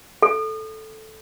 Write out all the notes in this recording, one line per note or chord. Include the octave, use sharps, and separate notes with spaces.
A4